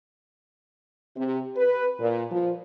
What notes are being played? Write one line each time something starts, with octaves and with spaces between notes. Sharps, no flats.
C3
B4
A#2
F3